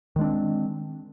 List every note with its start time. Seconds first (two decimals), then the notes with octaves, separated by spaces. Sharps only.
0.16 D#3
0.19 G#3
0.21 D4
0.24 C4